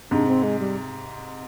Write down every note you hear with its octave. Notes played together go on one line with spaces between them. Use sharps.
G#2 C3 D4
C4
G#3
G3